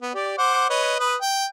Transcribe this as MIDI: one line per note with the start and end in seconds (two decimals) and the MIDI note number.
0.02 0.13 59
0.14 0.37 67
0.14 0.37 74
0.38 0.68 72
0.38 0.68 78
0.38 0.68 86
0.70 0.95 71
0.70 0.95 73
0.70 0.95 75
1.00 1.15 71
1.00 1.15 87
1.21 1.46 79